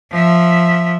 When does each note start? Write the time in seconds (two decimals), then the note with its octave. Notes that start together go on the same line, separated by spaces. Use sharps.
0.12 F3 E5